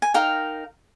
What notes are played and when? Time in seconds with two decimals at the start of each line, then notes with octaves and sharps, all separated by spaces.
0.02 G#5
0.14 D#4 A#4 F5 G5